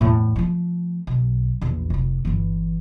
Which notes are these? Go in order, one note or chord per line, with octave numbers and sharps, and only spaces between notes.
E2 A2
F3 A3
B1
A#1 E2
F1 D#4
G1 E3